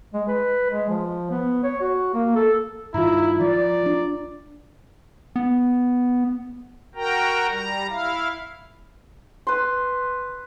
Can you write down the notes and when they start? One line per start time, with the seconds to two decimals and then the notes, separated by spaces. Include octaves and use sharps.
0.13 G#3
0.28 B4
0.70 G#3
0.90 F3
1.31 B3
1.63 C#5
1.81 F#4
2.14 A#3
2.36 A4
2.94 G2 D#3 E4 F4 A#5
3.41 F3 D5
3.86 D4
5.36 B3
6.95 F#4 A#4 G5 A#5
7.48 G3 A#5
7.88 E4 F5
9.47 B4 C6